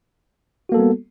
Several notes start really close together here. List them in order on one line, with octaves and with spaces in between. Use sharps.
F#4 A#3 A4 G3 B3